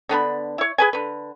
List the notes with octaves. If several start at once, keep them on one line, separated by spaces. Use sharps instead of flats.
D3 B3 D4 B5
E4 C#5
G#4 B4 G#5
D3 B4